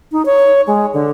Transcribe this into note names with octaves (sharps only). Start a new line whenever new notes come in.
D#4
C#5
G#3
D3